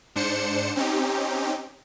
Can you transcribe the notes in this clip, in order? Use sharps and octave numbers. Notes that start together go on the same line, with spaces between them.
G#2 D4 C5 C#7 E7
C4 C#4 D#4 G4